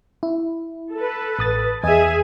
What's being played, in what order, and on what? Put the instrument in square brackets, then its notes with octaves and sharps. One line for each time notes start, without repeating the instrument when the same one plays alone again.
[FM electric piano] E4
[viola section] A4 B4
[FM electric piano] A1 D#6 A6
[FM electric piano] E2 D#5 [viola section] G#4 E5 G#5